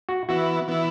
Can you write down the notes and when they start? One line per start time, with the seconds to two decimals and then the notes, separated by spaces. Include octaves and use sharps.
0.09 F#4
0.29 E3 B3 E4 F#4
0.68 E3 B3 E4